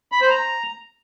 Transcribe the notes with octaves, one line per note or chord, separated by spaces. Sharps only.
B5
C5
A#5